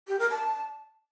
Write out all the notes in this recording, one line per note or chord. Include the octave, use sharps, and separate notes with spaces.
G4
A#4
A5